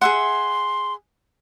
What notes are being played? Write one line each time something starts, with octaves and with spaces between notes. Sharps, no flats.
G#4 E5 F#5 C6